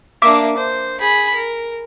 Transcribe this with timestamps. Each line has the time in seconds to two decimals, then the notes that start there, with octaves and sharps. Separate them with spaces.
0.22 A#3 D4 E5 D6
0.57 C5
1.00 G#4 B5
1.34 A#4